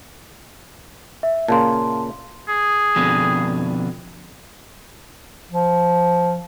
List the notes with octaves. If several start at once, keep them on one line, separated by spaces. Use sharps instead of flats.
E5
A#2 C#3 A#3 A5 C6
G#4
F2 B2 D3
F3